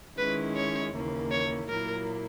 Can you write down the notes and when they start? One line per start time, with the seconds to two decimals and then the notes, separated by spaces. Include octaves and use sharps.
0.18 D#3 G#3 C#4 E4 B4
0.56 C#5
0.93 D#2 C#3 E3 A#3
1.32 C#5
1.69 A#2 F#3 A#3 E4 A#4